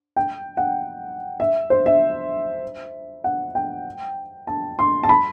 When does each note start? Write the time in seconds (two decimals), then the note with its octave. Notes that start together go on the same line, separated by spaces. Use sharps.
0.16 G5
0.57 F#5
1.40 E5
1.70 C5
1.86 E5
3.24 F#5
3.55 G5
4.47 A5
4.79 C6
5.03 A5
5.09 B5